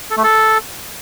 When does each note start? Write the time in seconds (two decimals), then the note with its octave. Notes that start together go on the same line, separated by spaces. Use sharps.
0.10 A4
0.17 A3
0.24 A4